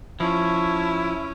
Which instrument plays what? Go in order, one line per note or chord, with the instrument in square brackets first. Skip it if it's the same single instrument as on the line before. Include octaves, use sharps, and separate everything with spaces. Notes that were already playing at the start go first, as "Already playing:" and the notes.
[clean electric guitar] F3 [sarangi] C#4 [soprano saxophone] E4 [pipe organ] A5 C#6